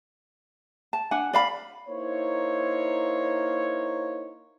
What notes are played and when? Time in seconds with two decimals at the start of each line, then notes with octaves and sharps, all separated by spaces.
0.93 A5
1.11 D4 F#5 G#5
1.33 D5 F5 B5
1.88 A#3 D#4 E4 C5 C#5